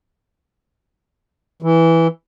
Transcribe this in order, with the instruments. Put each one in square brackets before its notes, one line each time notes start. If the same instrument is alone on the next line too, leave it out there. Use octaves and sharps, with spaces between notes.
[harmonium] E3